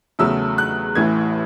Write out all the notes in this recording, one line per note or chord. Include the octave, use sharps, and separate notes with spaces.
E2 C#3 F#3 A3 E6
F#6
A1 A2 E3 G#6